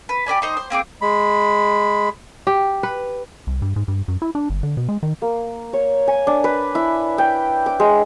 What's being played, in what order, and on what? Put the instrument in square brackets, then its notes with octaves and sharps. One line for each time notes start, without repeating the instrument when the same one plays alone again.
[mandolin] B4
G4 B4 D5 G#5
D#4 C5 D#5
C5
A#3 C4 G#4 D6
[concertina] G#3 B5
[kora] G4
B4
[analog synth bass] C2
G2
G#2
G2
F#2
E4
D4
G1
D3
B2
G#3
D#3
[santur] A#3
C#5
G#5
D4
B4
E4
G5
D6
G#3